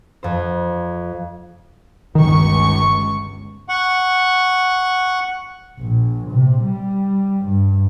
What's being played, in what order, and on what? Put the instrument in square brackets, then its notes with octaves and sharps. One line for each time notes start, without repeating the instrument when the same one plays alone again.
[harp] F2 C5
[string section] G1 C#2 C#6 [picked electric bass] D#3
[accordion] F#5 C#6
[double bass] A#1
C3
G3
G2